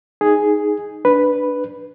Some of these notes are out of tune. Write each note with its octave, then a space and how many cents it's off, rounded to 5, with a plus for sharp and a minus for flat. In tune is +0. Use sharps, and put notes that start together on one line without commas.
D#4 +0 G#4 +0
D4 +0 B4 +0